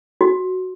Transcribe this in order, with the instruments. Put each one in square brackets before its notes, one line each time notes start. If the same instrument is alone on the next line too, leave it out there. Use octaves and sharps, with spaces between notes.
[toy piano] F#4